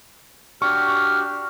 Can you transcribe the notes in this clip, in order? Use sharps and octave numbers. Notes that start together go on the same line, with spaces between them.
D4 F#4 G4 C#6 F6